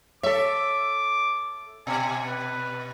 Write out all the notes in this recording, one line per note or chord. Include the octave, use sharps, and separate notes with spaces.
A4 C#5 E5 D6
B2 G#5
B4